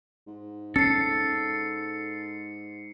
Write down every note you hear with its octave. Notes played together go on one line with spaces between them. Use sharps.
G#2
C#4 A4 C7 C#7